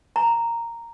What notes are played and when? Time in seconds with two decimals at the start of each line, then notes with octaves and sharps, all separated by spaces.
0.16 A#5